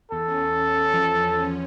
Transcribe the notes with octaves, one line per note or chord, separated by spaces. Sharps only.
E2 A4
C#4
E2
C#4
E2
F3
F3
C#4
C#4